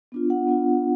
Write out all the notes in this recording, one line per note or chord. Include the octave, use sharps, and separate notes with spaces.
B3 D4 F4
F#5
B3 D4 F4